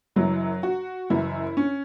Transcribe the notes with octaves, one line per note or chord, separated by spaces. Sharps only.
F#1 F#2 E3 F#3
F#4
F#1 F#2 E3 E4
C#4